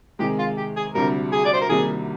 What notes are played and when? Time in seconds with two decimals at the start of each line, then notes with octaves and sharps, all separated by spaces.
0.19 C3 D#3 G#3 G4
0.38 F4
0.57 G4
0.76 G#4
0.95 D2 C3 G3 A#4
1.32 G#4
1.45 D5
1.53 C5
1.61 A#4
1.69 C2 C3 D#3 G3 A#3 G#4